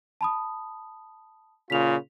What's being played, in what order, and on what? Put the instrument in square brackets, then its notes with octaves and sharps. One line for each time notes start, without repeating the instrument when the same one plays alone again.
[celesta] A5 B5 D#6
[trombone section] A#2 C#3 F4 [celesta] B6 F7